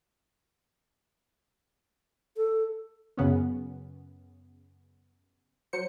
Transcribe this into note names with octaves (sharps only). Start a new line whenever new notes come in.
A4
F#2 C#3 B3 C#4
F#3 C5 C#7